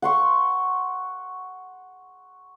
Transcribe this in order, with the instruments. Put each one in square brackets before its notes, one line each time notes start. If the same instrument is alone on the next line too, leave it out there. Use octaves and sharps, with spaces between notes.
[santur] F#5 C6 C#6